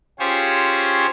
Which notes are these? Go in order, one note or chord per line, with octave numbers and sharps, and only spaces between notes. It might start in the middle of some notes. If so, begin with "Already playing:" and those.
C#4 F4 G4 G#4 C5 C#5